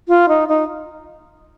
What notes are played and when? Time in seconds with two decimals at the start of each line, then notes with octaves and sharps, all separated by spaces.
0.08 F4
0.29 D#4
0.48 D#4